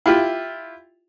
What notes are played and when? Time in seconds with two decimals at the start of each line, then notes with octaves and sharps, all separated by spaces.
0.06 E4 F4 G4